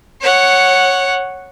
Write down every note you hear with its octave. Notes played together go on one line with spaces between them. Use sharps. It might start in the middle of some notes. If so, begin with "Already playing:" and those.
C#5 F#5